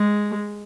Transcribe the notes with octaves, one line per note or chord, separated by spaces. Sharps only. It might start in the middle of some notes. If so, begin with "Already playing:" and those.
Already playing: G#3